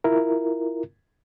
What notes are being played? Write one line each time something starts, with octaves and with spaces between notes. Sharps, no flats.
E4 F4 A#4